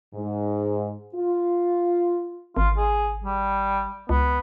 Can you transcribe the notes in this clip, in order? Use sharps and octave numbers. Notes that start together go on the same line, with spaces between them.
G#2
F4
G#1 F4
G#4
G3
C#2 B3